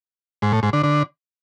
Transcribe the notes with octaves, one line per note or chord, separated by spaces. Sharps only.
G#2
A2
G#2
D3
D3